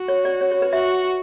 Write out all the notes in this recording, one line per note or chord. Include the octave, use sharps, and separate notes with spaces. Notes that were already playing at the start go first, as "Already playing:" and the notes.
Already playing: F#4
C#5
D5
C#5
C#5
B4
F#4 E5